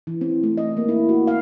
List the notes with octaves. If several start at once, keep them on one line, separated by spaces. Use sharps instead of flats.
E3
C4
A3
D#5
A#3
E4
F#4
F5